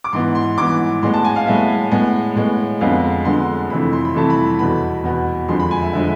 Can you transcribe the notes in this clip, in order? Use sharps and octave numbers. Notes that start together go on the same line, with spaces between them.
D6
G#2 E3 B3 C6
C6
G#2 E3 B3 D6
A2 G#3 B3 C6
A5
G#5
F5
A2 G#3 B3 E5
A2 G#3 B3
A2 G#3 B3
F2 D3 G#3 B3 F5
F2 D3 G#3 B3 C6
F2 C3 E3 A3 B5
C6
B5
F2 C3 E3 A3 A5
B5
E2 B2 B3 B5
E2 B2 B3
F2 D3 F3 G#3 C6
B5
G#5
E5
D3 F3 G#3 E5